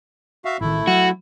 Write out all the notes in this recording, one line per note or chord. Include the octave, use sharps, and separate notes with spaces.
F#4 E5 F5
A1 D#3 A3 E4
F#3 F#4